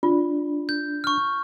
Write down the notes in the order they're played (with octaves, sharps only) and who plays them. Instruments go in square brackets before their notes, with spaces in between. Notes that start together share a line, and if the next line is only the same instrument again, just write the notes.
[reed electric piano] D4 [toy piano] F4
[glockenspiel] G6
C#6 F6